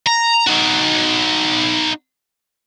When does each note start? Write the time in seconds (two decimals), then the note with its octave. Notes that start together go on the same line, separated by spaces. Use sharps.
0.06 A#5
0.47 D#4 F#4